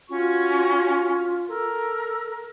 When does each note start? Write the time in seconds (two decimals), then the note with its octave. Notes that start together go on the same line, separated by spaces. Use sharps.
0.10 C#4 F4 F#4 C#6
1.49 A4 A#4